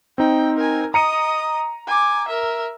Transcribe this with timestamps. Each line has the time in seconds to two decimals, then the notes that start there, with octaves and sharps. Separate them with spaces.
0.18 C4 D#4 G5
0.57 A#4 G#5
0.94 D#5 A#5 D#6 C#7 D#7
1.87 G#5 D6
2.28 A#4 E5